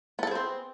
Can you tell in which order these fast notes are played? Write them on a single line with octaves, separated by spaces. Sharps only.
B3 A4 G#4 C5 C4